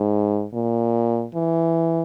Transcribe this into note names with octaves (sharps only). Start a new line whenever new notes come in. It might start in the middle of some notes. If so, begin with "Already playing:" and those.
Already playing: G#2
A#2
E3